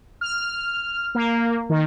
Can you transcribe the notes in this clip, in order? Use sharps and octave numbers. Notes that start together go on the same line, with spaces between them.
F6
A#3
D#3